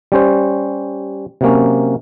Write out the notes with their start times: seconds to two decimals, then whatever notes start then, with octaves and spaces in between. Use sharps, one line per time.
0.12 G3 C#4 C5
1.41 C3 F#3 A#3 C#4